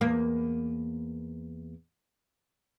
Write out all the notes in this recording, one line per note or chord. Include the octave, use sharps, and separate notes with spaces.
E2 A#3